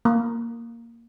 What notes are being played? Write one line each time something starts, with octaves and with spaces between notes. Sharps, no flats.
A#3